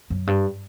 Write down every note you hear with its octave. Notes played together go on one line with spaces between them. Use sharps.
F#2
G2